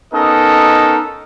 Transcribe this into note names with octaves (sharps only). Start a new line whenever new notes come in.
B3 C#4 D#4 A4 A#4 D#5